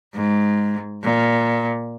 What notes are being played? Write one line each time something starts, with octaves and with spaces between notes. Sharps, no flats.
G#2
A#2